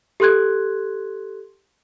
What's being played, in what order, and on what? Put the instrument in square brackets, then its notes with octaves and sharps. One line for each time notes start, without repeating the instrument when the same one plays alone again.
[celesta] G4 A4 C6 F#6 G#6